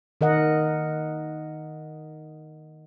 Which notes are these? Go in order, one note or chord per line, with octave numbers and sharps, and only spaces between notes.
D#3 A#4 D#5 F#5